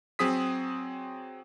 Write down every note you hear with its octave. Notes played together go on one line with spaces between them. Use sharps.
F#3 C4 G#4 D#6 B6